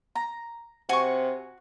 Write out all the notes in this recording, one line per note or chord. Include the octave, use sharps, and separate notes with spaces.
A#5
C3 F#4 G#5 C#6